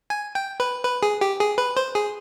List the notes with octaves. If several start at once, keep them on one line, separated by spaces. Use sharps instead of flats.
G#5
G5
B4
B4
G#4
G4
G#4
B4
C5
G#4